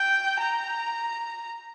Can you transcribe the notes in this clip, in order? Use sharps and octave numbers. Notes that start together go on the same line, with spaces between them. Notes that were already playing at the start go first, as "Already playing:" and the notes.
Already playing: G5
A#5